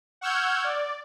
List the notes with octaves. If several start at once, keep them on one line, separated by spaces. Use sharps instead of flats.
F#5 C#6 E6 F6 G6 G#6
D5